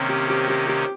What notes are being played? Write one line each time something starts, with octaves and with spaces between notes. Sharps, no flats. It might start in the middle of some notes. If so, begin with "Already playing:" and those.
Already playing: C3 D#3 A#3 C4 C#4
G4
G4
G4
G4